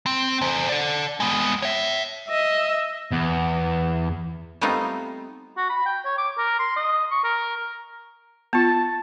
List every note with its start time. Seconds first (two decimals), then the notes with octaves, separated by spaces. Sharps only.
0.06 C4
0.41 E2 C5
0.69 A4 D5
1.20 G#3 B3
1.62 C#5 E5
2.29 D#5 E5
3.12 E2
4.61 G3 A3 B3 C4 D#4 F4
5.57 F#4
5.70 B5
5.86 G5
6.05 C#5
6.18 D6
6.38 A#4
6.59 C6
6.76 D#5
7.11 C#6
7.24 A#4
8.53 B3 F4 A5